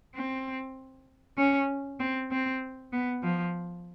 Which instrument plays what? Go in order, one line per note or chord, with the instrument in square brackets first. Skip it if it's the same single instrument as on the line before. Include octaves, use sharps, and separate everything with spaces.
[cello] C4
C#4
C4
C4
B3
F3